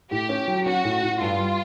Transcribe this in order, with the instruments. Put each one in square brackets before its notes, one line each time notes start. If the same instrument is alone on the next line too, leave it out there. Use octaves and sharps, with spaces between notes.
[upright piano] A2 [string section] G4
[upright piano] C#4
F#3
[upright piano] C#4 [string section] F#4
[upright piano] A2
A2
[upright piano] G2 [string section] F4
[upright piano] G3